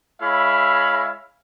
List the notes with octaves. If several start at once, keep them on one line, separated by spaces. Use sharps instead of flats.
G#3 E4 C#5 E5 F5 B5